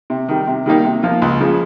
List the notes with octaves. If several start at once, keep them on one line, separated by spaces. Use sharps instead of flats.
C3
D#3 G3
C3
D#3 G3 A#3 D#4
C3
F3 A#3 F4
C#2
C#3 F3